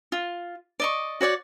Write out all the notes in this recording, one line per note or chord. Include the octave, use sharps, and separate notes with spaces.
F4
D5 D#5 C#6
F#4 C#5 D5 F#5